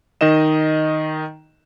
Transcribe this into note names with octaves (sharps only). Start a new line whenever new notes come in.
D#3 D#4 D#5 E7